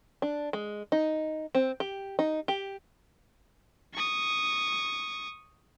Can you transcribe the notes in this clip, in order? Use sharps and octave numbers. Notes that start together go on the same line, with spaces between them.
D4
G#3
D#4
C4
G4
D#4
G4
C#6 D#6